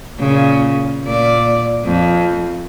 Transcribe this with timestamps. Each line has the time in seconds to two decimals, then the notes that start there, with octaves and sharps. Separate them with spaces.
0.19 A#2 C#3
1.03 A#2 D5
1.85 F2